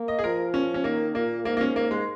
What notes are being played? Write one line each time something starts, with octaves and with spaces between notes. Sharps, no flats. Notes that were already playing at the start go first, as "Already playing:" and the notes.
Already playing: A#3
D#5
G#4
F3 A#4
C#4
C#4
D#3 A#3
A#2 A#3
G#2 A#3
A#3
C#4
A#3
G#3